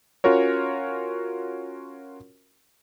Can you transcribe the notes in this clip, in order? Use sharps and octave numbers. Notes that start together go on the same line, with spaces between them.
C#4 F4 F#4 A#4 C#5